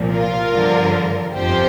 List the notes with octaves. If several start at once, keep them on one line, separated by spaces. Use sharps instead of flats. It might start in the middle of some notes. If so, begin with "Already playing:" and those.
Already playing: C2 A#2 F3
F4 A#4
G1 G2 D3 F3
G1 F2 C3 F3 G4 C5